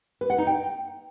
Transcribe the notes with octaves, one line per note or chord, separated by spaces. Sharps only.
B4
F#5
D#4
G5